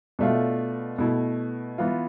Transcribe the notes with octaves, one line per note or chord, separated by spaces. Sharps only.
B2 A3 D4 F4
B2 A3 E4
E3 B3 F4